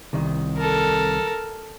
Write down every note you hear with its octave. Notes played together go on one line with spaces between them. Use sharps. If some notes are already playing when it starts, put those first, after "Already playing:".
C2 D#3
A4 A#4